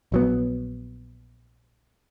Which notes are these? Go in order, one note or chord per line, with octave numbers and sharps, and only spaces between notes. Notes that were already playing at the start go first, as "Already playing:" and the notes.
A#1 F#3 B3